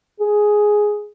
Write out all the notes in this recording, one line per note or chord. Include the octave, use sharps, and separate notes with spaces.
G#4